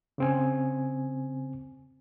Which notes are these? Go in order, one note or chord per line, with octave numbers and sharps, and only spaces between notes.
C#3 C4 G#5